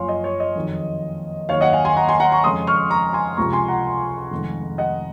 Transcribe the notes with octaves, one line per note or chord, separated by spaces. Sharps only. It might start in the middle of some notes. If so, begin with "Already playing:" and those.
Already playing: F#1 F#2 F3 C#5 F5 G#5 C6
D#5
C#5
D#5
F2 D#3 F#3
D#2 D#3 F#3 C#5 F5
D#5 F#5
F5 G#5
G#5 C6
F#5 A#5
G#5 C6
F#5 A#5
A#5 C#6
F2 C#3 G#3 C6 D#6
C#6 F6
A#5 C#6
G#5 C6
C#2 C3 F3 G#3 A#5 C#6
G#5 C6
F#5 A#5
F1 F2 D#3 G#3
D#5 F#5